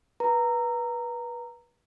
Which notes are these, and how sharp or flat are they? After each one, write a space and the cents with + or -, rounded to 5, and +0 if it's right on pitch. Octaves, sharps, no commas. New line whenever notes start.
B4 -25 A#5 -15